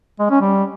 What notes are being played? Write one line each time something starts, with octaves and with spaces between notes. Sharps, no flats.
G#3
C#4
G3